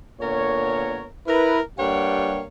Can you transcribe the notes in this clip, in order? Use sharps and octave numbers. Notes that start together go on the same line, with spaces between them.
A#2 D3 B3 A#4 C#5
E4 A#4 B4
G2 G3 A#3 C#5 F#5 G5